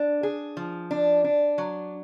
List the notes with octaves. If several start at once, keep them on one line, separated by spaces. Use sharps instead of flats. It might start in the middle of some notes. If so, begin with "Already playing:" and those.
Already playing: D4
G#4
F3
D4
D4
F#3